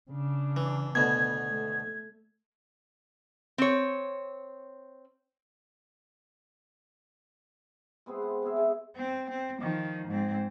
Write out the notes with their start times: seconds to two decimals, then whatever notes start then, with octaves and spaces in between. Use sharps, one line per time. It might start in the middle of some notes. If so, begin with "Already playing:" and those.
0.11 C#3 D4
0.56 E3
0.95 D2 B2 B3 G#6
1.50 A3
3.58 C4 C#5
8.06 G#3 B3 C4 G#4
8.22 F#5
8.42 C3 B3 G#4 E5
8.57 G#3
8.96 C4
9.30 C4
9.61 D#3 F3
10.08 G#2 C4